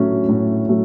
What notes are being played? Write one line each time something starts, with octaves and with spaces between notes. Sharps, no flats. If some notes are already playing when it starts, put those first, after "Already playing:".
Already playing: A2 F#3 A3 C#4
A2
F#3 A3